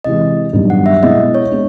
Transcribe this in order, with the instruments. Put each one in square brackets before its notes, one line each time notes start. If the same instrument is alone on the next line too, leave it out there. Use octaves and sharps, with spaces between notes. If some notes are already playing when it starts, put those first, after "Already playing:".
[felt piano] C3 E3 G#3 [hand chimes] D#5
[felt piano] G2 D#3 F#3 B3
[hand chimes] F#5
E5
[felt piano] B2 G#3 B3 E4 G#4 [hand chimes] D#5
[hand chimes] C#5
[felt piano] G#3 B3 D4